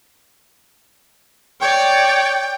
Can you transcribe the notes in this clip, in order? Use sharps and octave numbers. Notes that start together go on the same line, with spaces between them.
C#5 D5 G5